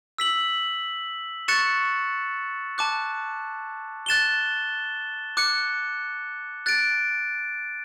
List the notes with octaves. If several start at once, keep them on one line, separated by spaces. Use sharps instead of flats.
E6 B6 F#7
C#6 F#6 A6 C#7 E7
A5 D6 F#6
F#6 A6 E7 G7
D6 F#6 C#7
F#6 A6 D7